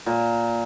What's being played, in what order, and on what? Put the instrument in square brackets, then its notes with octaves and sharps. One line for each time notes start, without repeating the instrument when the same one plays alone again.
[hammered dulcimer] A#2